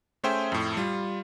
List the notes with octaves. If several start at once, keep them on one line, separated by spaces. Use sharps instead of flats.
A3 C#4 G#4 C5 E5 G5
F2 A2
G3 F4